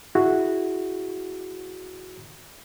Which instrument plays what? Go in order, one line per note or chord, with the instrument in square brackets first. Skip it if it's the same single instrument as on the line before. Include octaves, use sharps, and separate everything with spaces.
[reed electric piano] E4 F#4 G#4